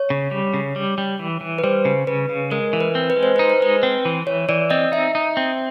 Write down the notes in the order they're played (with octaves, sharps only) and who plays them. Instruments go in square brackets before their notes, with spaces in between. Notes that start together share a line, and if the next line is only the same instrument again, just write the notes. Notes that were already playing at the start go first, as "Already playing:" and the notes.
Already playing: [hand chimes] C#5
[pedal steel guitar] C#3
G3
C#3
G3
G3
E3
E3
[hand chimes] B4
[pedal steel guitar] G3 [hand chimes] C5
[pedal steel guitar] C#3
[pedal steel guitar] C#3 [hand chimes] B4
[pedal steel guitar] C#3
[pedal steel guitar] G#3 [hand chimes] A#4
[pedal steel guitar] E3
[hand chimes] B4
[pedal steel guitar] C4
[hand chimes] B4
[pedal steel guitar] G#3
[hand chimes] C5
[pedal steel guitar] D#4 [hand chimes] B4
[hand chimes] C5
[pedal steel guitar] G#3 [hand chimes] B4
[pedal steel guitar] C4
E3
[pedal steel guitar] E3 [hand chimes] C#5
[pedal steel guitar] E3 [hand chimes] D5
[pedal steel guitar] C4 [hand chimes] D#5
[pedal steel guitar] D#4 [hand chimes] E5
[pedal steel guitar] D#4
C4